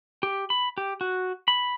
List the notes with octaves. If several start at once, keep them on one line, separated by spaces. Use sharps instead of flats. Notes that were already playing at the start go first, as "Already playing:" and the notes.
G4
B5
G4
F#4
B5